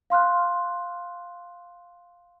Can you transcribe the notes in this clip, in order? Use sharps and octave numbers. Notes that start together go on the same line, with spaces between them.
F5 C6 F6 F#6